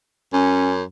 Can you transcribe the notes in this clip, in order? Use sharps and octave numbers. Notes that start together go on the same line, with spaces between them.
F#2 C#4